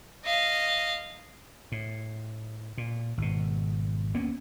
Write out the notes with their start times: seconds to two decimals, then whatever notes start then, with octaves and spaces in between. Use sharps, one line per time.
0.25 D#5 F5
1.72 A2
2.78 A#2
3.18 G#1 B2
4.14 D2 A#3 B3 C#4